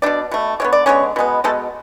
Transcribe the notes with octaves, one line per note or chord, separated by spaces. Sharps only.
B2 A3 D4 D5
B2 A3
D3 G#3 B3 C#5
D5
D3 G#3 B3 C#4 C#5
B2 G#3 B3
B2 G#3 A3 B3 A4